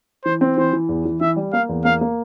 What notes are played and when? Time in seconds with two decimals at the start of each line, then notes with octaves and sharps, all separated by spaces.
0.25 E3 C5
0.41 C4
0.57 E3 C5
0.73 E3
0.89 E2
1.05 E3
1.21 E3 E5
1.36 G3
1.53 A#3 F5
1.69 E2
1.85 A#3 F5
2.01 A#3